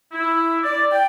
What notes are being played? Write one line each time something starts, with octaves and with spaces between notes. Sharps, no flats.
E4
D5
G5